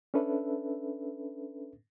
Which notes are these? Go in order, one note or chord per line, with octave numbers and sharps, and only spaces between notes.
C#4 D4 A4 B4 E5